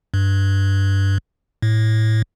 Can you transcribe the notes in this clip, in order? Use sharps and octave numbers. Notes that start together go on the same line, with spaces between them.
G2
A2